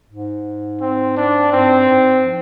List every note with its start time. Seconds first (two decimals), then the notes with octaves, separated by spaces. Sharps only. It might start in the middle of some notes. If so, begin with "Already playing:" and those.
0.09 G#2
0.81 C4
1.17 D4
1.53 G2 C4
1.89 G#2
2.25 F3